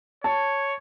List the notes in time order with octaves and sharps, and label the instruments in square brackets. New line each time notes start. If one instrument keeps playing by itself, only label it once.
[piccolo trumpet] C#5 [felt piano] A5